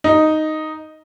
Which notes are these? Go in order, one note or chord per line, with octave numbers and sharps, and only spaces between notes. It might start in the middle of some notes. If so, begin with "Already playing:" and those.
D#4